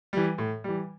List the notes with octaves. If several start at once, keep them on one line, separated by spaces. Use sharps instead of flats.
E3 G3
A2
E3 G3